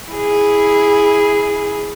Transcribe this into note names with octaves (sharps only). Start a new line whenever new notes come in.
E4 G#4